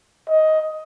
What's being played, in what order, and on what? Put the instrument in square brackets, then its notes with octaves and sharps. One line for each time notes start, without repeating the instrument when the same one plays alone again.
[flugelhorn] D#5